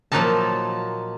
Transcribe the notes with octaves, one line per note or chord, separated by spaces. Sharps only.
A#2 F3 F#3 A#3 D#4 A5